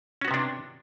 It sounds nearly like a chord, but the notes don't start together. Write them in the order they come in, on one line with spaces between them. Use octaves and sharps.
C#4 F#4 B3 C3 D4